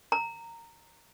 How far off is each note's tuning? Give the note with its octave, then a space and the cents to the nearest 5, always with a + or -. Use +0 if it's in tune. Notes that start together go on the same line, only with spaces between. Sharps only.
A#5 -15